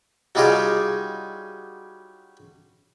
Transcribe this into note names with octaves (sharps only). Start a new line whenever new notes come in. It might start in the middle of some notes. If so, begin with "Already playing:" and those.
F#3 G3 D#4 F4 G4 G#4